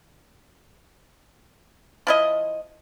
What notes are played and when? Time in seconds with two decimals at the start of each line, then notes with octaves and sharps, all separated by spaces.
2.07 F3 E4 D#5